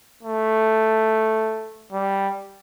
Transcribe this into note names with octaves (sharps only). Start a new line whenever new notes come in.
A3
G3